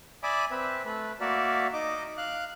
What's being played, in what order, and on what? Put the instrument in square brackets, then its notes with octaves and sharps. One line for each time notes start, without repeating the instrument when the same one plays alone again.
[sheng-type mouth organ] D5 E5 G#5 B5 D6 D#6
C4 B4 E5
A3 B4
A#3 F#4 A#4 D5 E5
D#4 D#5 D6
F5 F#6